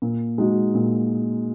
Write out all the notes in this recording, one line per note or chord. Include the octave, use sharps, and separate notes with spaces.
A#2
G#3 D#4 F#4
A#2